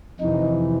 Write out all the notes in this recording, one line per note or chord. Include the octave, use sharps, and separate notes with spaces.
F2 C3 E3 D#4